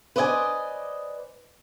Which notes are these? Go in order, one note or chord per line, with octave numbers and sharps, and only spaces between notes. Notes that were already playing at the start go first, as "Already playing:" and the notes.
B4 C5 D5 D#5 F5 G#5